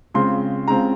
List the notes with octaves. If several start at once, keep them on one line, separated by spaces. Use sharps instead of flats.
C#3 G#3 C4 F4 C6
C#3 G#3 C4 F4 A#5